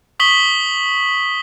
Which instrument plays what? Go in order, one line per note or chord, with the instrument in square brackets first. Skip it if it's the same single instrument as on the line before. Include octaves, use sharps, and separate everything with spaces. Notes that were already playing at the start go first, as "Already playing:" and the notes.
[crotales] C#6 D#6 B6 F#7 G7